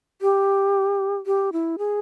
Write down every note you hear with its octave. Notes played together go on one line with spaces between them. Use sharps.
G4
G4
E4
G#4